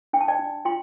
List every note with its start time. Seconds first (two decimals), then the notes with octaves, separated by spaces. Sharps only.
0.13 D4 G5
0.21 A5
0.28 D5 G5
0.39 D4
0.65 F4 G5 C6